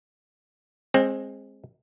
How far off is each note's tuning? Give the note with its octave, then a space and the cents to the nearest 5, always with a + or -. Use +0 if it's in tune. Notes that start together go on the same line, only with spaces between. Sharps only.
G#3 -5 C4 +20